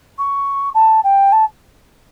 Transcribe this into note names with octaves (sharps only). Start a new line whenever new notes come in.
C#6
A5
G5
A5